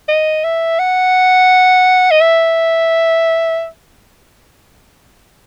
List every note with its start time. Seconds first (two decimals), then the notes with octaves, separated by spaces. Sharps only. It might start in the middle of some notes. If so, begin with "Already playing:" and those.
0.09 D#5
0.44 E5
0.79 F#5
2.11 D#5
2.21 E5